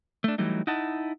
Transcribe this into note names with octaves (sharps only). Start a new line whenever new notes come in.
A3 D4
E3 F#3 G3 A3 D#4
D#4 E4 D#5 F#5 A5